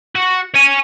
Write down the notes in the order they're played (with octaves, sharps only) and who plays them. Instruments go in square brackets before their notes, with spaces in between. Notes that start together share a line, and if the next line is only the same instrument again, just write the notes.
[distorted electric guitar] F#4
C#5 G#5